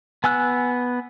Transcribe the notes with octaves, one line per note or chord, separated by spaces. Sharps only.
B3 G#5 E6 F#6